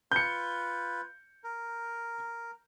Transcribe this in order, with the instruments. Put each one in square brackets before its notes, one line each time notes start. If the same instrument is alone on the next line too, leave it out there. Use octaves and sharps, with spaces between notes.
[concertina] F4 B4 [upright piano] G6 C#7
[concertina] A#4